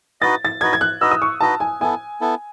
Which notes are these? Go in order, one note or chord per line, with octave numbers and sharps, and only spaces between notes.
D#4 F#4 B4 D#5 A6
A6
D#4 F#4 B4 D#5 G#6
G#6
F#6
D#4 F#4 B4 D#5 E6
D#6
C#6
D#4 F#4 B4 D#5 A5
G#5
B3 E4 A4 G#5
B3 E4 A4